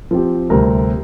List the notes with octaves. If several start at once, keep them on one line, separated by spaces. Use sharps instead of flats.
F3 C4 G4
D2 C3 G3 C4 A#4